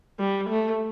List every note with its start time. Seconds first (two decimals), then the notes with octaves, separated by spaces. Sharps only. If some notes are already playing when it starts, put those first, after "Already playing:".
0.20 G3
0.49 A3